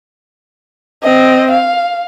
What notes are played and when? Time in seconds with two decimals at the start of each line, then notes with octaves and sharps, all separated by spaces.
1.03 C4 D#5
1.51 F5